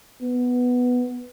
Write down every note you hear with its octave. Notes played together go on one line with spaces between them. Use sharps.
B3